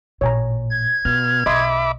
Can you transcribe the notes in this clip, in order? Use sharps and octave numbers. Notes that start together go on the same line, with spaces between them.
A1 A#2 C#5 G#5 A#5
G#6
B2 F4 F6
B1 D#5 E5 B5 C6 D6 D#6